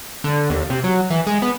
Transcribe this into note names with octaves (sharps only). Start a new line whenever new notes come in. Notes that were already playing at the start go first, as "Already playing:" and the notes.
D3
D#2
C3
F#3
E3
G#3
B3